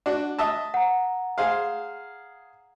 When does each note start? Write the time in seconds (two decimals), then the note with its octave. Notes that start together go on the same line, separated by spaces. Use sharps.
0.06 D4 F#4
0.39 D#5 E5 A5
0.74 F#5 A#5
1.38 G#4 C5 F5